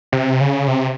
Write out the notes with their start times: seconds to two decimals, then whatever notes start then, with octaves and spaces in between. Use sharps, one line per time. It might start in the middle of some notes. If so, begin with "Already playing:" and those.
0.12 C3
0.41 C#3
0.68 C3